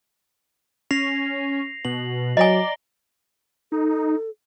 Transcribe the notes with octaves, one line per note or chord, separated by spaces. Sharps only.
C#4 A#6 C7 F7
B2 F#7
F#3 D5 D#5 G#5 A#5 A#6 G7
D#4 A4